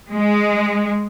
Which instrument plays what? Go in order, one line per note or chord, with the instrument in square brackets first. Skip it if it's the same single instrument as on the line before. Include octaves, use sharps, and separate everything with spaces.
[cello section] G#3